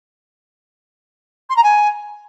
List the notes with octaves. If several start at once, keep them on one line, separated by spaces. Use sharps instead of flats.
C6
A#5
G#5